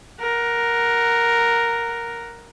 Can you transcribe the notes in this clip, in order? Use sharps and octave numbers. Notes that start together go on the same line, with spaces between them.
A#4 F#5